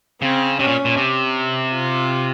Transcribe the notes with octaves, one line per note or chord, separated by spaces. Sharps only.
C#3 C4
C3 C#4
A#2
A#2
C3
F4